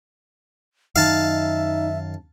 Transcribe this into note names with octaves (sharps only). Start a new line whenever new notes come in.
F#2 D#3 D#4 E5 F5 A5